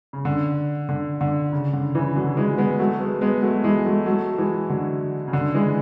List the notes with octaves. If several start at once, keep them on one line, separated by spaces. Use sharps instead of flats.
C#3
D3
D3
D3
C#3
D3
C#3 E3
D3 F#3
E3 G#3
G#3 B3
F#3 A3
G#3 B3
G#3 B3
F#3 A3
E3 G#3
F#3 A3
F#3 A3
E3 G#3
D3 F#3
C#3
D3
E3 G#3